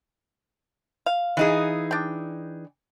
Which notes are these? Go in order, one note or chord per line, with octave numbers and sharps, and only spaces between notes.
F5
E3 D#4 G#4
D4 G5